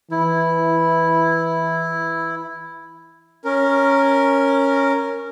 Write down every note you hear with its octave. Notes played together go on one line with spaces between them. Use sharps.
E3 E4
C#4 A#4